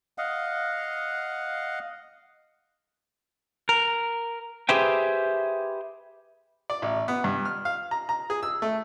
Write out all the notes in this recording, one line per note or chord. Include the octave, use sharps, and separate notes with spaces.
D#5 F5 F#5
A#4
G4 G#4 B4 C5 E5 G5
D5
A1
B3
G2
F6
F5
A#5
A#5
G#4
E6
A3